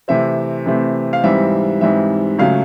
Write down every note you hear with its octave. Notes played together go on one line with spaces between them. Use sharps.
C3 E3 A3 C4 E5
C3 E3 A3 C4
F5
G#2 E3 G3 C4 E5
G#2 E3 G3 C4 E5
C#2 C#3 F#3 A3 F5